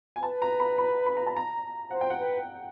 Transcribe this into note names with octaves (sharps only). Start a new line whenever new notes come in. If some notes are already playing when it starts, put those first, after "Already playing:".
G#5
B4 A5
A#5
B5
B5
B5
A#5
A5
A#5
C5 F#5
G5
F#5
B4